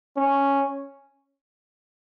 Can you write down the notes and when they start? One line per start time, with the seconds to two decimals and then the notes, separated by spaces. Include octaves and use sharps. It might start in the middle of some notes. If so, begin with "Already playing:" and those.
0.17 C#4